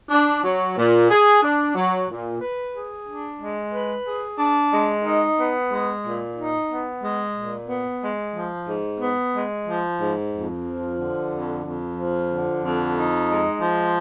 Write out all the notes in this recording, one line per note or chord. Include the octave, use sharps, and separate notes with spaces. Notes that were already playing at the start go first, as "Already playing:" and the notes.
D4
F#3
A#2
G#4
D4
F#3
A#2
B4
G#4
D4
G#3
B4
G#4
D4
G#3
D#4
B3
G#3
A#2
D#4
B3
G#3
A#2
B3
G#3
F3
G#2
B3
G#3
F3
G#2
F2
F3
D3
F2
F2
F3
D3
F2
D#4
G#3
F3